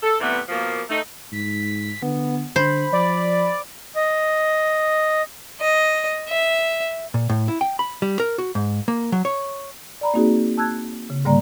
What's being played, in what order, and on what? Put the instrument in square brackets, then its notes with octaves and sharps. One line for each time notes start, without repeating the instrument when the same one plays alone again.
[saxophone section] A4
C3 E3 G3 A3 B3
B2 F3 A#3
A3 D#4
[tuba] G#2 [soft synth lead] B6
[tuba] D3 [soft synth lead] B3
[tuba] D3 [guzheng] C5 [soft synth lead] B5
[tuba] F3 [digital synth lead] D5
[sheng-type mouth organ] D#5
[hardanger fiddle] D#5
E5
[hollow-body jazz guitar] A#2
A2
E4
G5
B5
G3
A#4
F#4
G#2
A#3
F#3
C#5
[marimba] D5 A#5 B5
A#3 C4 D#4 F#4 G#4
A5 E6 F#6 G#6
C#3
G#2 D3 G3 A#3 D5 A#5